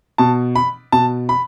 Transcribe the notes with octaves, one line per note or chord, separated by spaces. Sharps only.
B2 A5
B5
B2 A5
B5